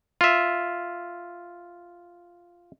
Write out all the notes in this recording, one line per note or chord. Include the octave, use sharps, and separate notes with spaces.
F4 E5